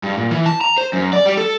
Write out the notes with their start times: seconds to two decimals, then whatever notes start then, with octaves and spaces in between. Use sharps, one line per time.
0.03 G2
0.17 A#2
0.31 E3
0.46 A5
0.61 A#5
0.78 C5
0.93 F#2
1.13 D5
1.25 G3
1.37 A4